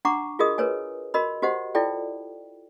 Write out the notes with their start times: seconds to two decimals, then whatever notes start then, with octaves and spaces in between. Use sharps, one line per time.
0.05 D4 F#5 A#5 C#6 D6
0.39 F4 F#4 G#4 A#4 D#5 D#6
0.58 A#4 B4 C#5 G#5
1.14 F#4 A#4 D#5 B5
1.42 F#4 G4 C5 D#5 F#5
1.75 E4 F4 A4 D5 G5